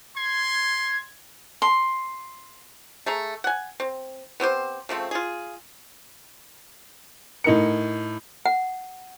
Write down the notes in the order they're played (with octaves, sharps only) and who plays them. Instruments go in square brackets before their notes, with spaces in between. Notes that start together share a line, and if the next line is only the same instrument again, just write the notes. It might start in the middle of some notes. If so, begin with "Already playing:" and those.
[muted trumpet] C6 [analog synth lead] G#6
[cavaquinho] C6
[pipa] A3 G#4 A#5
F#5 G#5
C4
B3 C4 G4 C5
C#3 F3 A3 C4
F4 G#4
[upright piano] A2 D#4 A#4 C#7
[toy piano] F#5